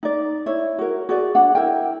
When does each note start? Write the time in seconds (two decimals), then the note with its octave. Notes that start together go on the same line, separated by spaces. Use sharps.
0.03 D#4 D5
0.46 E4 C#5
0.79 F#4 A#4
1.09 F#4 G#4 D5
1.35 D4 F#5
1.55 E4 A#4 G5